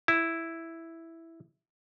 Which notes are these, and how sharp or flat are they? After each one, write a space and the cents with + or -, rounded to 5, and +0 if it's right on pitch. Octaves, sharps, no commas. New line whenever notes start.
E4 +0